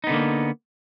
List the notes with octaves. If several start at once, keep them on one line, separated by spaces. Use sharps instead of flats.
D3 A#3 B3 D#4